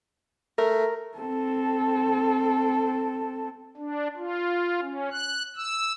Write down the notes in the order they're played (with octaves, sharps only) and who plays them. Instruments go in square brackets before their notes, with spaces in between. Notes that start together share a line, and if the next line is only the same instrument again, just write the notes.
[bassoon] A3 [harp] A#4
[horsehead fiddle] C4 A4
[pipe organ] D4
F4
C#4
F#6
E6